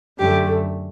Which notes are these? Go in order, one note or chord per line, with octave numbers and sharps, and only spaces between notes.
F#2 D3 A3 G4